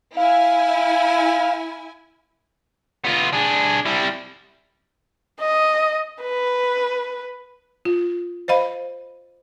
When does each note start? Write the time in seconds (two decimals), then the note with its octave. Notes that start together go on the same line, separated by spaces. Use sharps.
0.17 E4 F5 G#5
3.05 B3 F4
3.33 D4 G#4
3.85 G3 E4
5.41 D#5
6.22 B4
7.85 F4
8.48 C5 D#5 F5 B5